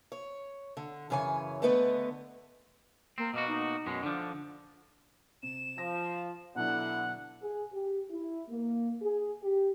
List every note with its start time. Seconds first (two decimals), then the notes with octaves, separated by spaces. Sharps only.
0.12 C#5
0.77 D3
1.10 F#2 C#3 E3 C#5 G#5
1.62 D3 A3 B3 B4 D#5
3.18 A#3 C4
3.34 B2 A#3 F#4 D#5
3.47 D#4
3.86 F#2 B2 G#3
4.03 D3 F3 D4
5.43 C3 E7
5.78 F3 A#6
6.55 B2 D3 F#3 D4 E4 F#5
7.42 G#4
7.72 G4
8.10 E4
8.49 A#3
9.02 G#4
9.42 G4